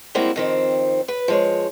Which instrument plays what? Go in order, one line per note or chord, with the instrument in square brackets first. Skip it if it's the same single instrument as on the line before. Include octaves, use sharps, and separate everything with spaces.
[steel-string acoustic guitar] G3 G#3 A#3 C4 E4 F#4
F2 D#3 C4
B4
F3 G#3 C#5